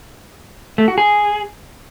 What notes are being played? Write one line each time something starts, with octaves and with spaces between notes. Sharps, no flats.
A3
F#4
G#4